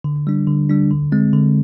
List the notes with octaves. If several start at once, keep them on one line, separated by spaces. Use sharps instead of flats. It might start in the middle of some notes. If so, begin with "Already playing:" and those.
D3
G3 D4
D3
G3 D4
D3
G#3 C4
D3